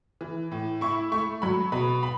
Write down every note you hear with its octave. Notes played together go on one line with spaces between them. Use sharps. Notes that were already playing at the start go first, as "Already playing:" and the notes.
E3
A2
E4 C#6
A3 C#6
F#3 B5
B2 B5
B5